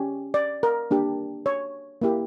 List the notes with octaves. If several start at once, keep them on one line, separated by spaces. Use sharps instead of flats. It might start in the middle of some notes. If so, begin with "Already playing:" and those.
Already playing: C#4 G4
D5
A#4
A#3 D4 G4
C#5
A#3 E4 G4